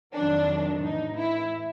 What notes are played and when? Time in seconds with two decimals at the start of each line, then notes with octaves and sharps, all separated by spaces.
0.14 F2 C3 D#3 F#3 D4
0.82 A2 E3 D#4
1.17 E4